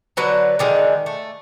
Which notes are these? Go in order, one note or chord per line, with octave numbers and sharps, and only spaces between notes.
D3 F#3 B4
D3 D#3 G#3
A3